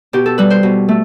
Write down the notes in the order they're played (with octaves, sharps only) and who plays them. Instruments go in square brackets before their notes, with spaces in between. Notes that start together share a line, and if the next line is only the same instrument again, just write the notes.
[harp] B2 G4
A4
G3 B4
C5
B2
A3